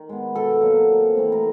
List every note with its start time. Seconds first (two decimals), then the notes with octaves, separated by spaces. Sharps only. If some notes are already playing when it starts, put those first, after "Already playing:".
Already playing: D#3
0.09 G#3 B3
0.35 B2 A4
0.61 F#3 A#3
0.89 C3
1.15 E3 A3 C4
1.32 A#4